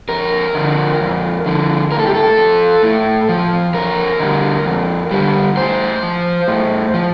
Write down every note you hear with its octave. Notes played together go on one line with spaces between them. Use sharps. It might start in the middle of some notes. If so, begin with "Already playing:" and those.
F2 A#4
D3 F3
F2
D3 F3
A2 A#4
A4
G4
A4
F3
A2
F3
F2 A#4
D3 G3
F2
D3 G3
A2 C5
F3
A2
F3